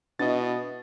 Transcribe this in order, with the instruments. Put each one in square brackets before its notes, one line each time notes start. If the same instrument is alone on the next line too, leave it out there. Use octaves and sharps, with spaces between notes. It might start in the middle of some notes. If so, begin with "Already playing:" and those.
[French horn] B2 [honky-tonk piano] D4 E4 [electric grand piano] D#5 A6